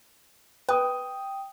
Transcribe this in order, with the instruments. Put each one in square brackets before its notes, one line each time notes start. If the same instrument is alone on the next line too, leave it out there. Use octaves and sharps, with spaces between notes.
[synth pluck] B4 [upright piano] G5 D#6